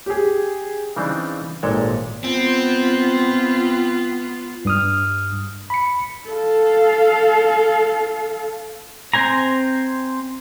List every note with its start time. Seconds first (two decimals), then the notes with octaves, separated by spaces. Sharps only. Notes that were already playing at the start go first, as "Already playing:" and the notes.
0.06 G4 G#4
0.96 C#3 E3 G3 C4 D4 D#4
1.63 G#1 A#2 G#3 A4 C#5 G5
2.24 B3 C4 F4
4.65 G2 D#6 F6
5.70 B5 C#7
6.29 A4 F5
9.14 C4 C5 G#5 A#5